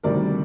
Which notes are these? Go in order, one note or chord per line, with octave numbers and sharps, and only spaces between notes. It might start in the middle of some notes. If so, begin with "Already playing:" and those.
D2 C3 D#3 G3 A#4 D5